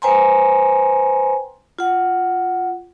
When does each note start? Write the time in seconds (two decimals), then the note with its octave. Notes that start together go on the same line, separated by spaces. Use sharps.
0.02 B4 C5 G5 G#5 A#5 C6
1.79 F4 F#5